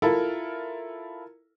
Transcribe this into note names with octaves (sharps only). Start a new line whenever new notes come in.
E4 F4 A4 A#4